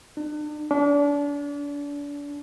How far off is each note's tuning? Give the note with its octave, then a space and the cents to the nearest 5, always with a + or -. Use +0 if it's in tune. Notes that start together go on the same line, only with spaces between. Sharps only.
D4 +35
D4 -35